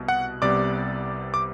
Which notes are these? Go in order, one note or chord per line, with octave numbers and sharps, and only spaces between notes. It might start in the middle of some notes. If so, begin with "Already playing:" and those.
Already playing: C2 B2
F#5 F#6
C2 C3 G3 B3 D5 D6
D6